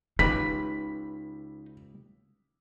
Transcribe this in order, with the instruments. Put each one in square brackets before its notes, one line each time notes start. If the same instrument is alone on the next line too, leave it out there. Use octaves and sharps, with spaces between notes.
[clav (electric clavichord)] C#2 G4 B4 [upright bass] D#4 [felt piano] B6